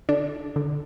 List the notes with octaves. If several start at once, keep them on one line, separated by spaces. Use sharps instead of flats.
D3 D4
D3